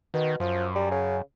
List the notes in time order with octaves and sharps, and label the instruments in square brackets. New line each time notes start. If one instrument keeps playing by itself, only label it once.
[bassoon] B2 [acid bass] D#3
[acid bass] F#2 [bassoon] F3
[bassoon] G3
C#3